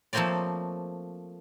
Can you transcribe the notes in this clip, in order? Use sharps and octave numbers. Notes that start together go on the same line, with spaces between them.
F3 A3 A#3 C4 C#5 D5